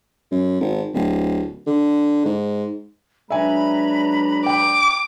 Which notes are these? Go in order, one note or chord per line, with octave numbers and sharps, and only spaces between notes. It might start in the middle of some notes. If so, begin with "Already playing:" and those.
F#2
G#1
D1
D3
G#2
F#3 G#3 D4 B4 E5 G#5 A#5 B5
G5 D6